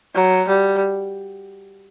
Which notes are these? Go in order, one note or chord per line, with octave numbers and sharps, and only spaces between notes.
F#3
G3